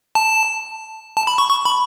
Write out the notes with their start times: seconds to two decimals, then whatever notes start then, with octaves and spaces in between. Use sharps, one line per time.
0.15 A5
1.17 A5
1.27 B5
1.38 C#6
1.50 C#6
1.65 B5